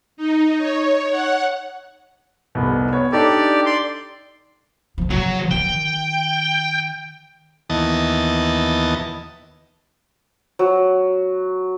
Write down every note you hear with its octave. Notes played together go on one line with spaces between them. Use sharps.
D#4
C#5
F#5
F1 C2 B3
B3 C#5
D4 D#4 G4 A4 D5
D5 C6
D#3 F3
C#3 F#3
D#3 G5
D#2 E3 B3 D#5 A5
F#3